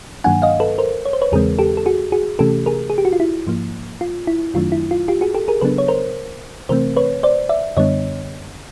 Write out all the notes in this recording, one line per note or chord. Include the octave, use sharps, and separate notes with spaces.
G2 D#3 F#3 A#3 D4 F#5 G#5
D#5 F5
A4 B4
A#4 C5
C#5
C5
B4 C#5
E2 C#3 E3 G#3 C4 G#4 A#4
G4 A4
A4
F#4 G#4
F#4 G#4
C3 E3 A3 C#4 G4 A4
G#4 A#4
G#4
G4
F#4
F4
E4
G#2 F3 A#3
F4
E4
F#2 D#3 F#3 A3 D4 F4
E4
F4
F4 G4
F#4 G#4
G4 A4
G#4 A#4
C#3 F#3 B3 D4 A4 B4
C#5
A#4 C5
C3 E3 A3 C4 A#4 C5
B4 C#5
C5 D5
D5 E5
F#2 D3 G3 B3 D4 C#5 D#5